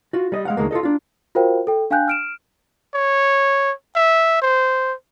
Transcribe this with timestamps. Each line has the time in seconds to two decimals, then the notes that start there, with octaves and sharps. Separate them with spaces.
0.13 F4 F#4
0.32 G3 D#5
0.45 G#3 F5 F#5
0.57 D2 G#2 D#3 G#3 A#3
0.71 F4 G#4 A4 D#5
0.83 D4 F4
1.35 F4 F#4 A#4 C5 F5 G5
1.67 A4 G5
1.91 D4 F5 G5 G#5 F#6 G6
2.08 F6 D7 E7
2.95 C#5
3.96 E5
4.42 C5